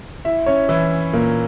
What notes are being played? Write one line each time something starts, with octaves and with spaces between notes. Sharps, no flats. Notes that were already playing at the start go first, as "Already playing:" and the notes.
E4 E5
C#4 C#5
E3 E4
A#2 A#3